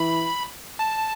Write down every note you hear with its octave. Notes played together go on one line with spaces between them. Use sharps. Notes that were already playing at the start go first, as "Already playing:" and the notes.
Already playing: E3 B5
A5